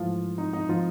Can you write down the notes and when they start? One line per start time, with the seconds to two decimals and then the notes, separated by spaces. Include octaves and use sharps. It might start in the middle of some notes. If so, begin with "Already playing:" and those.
Already playing: G#2 E3 F3 A3 F4
0.38 D#4
0.53 D#4
0.69 F3 F4